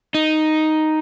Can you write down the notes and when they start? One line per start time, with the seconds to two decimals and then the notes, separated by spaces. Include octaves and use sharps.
0.15 D#4